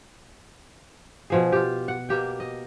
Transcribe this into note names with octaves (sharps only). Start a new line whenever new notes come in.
B2 F3 G#4
F4 G4
F#5
B2 A#3 G4 G5
D#5